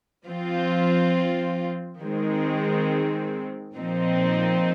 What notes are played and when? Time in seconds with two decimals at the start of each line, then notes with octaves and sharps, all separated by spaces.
0.25 F3 C4 F4
2.00 D#3 G#3 C4
3.75 A#2 F3 C4 D#4